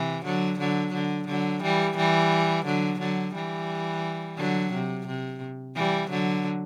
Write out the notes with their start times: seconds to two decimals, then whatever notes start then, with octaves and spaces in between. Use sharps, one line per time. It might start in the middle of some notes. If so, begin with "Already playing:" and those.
Already playing: C3 E3
0.25 D3 F#3
0.59 D3 F#3
0.94 D3
1.28 D3 F#3
1.63 E3 G3
1.97 E3 G3
2.65 D3 F#3
3.00 D3 F#3
3.34 E3 G3
4.37 D3 F#3
4.73 C3
5.07 C3
5.75 E3 G3
6.10 D3 F#3